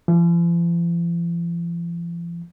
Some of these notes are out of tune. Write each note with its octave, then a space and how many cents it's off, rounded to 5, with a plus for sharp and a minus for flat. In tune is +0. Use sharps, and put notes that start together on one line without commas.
F3 -45